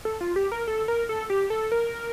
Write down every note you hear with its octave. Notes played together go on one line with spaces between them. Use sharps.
A4
F4
G4
A#4
A4
A#4
A4
G4
A4
A#4